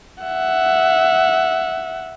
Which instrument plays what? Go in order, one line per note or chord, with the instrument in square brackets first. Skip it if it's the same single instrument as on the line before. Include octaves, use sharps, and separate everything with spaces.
[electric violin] E5 F#5